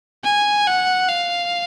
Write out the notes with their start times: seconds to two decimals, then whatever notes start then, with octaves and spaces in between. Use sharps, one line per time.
0.24 G#5
0.66 F#5
1.09 F5